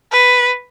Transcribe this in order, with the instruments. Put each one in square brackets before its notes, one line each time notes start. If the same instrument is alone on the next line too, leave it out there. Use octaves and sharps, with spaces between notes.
[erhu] B4